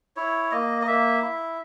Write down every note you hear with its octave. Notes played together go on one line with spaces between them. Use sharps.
E4 C#5
A#3 D#5
D#5
A#3 E5
E4